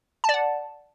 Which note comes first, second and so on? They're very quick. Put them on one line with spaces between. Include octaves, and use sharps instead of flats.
A5 D5 F#5